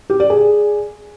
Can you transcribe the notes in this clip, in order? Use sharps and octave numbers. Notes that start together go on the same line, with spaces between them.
G4
D5
G#4